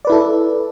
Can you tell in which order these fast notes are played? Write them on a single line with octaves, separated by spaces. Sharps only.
D5 B4 E4 A4